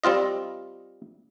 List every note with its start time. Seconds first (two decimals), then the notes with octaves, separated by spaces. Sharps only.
0.04 G3 C4 F4 D#5